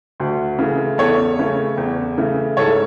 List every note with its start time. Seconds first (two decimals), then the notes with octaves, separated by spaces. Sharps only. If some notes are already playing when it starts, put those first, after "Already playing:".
0.20 D2
0.58 C#3 E3 A3
0.98 E2 A4 C#5
1.39 C#3 E3 A3
1.77 E2
2.17 C#3 E3 A3
2.57 G#2 A4 C#5